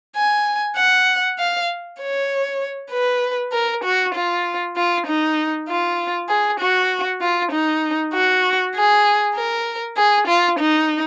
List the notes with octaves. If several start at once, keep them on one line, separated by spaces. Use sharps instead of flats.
G#5
F#5
F5
C#5
B4
A#4
F#4
F4
F4
D#4
F4
G#4
F#4
F4
D#4
F#4
G#4
A#4
G#4
F4
D#4